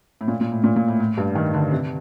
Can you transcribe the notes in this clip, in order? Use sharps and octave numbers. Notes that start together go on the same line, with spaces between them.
A2
A#2
A#2
A2
A#2
A#2
A2
A2
G2
D#3
D3
C3